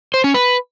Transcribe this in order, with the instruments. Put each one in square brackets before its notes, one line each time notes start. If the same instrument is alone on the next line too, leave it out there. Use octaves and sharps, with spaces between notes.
[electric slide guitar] C5
C#4
B4